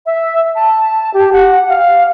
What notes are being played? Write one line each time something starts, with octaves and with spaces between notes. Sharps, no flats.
E5
A5
G4
F#5
F5